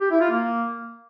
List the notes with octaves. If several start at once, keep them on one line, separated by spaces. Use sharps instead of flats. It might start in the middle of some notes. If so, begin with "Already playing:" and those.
G4
E4
F4
A#3